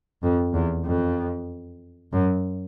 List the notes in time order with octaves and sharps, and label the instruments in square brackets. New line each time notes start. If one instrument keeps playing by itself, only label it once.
[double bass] F2
E2
F2
F#2